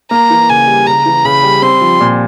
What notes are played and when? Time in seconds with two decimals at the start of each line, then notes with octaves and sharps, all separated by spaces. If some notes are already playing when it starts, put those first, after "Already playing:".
0.11 A#3 A#5
0.30 E3
0.49 C#3 G#5
0.67 G3
0.87 C#3 A#5
1.06 E3
1.25 C#3 B5
1.43 G3
1.62 C4 C6
1.81 F3
2.00 A#2